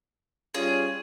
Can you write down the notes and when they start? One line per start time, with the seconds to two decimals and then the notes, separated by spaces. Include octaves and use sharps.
0.54 G3 C#4 F4 G#4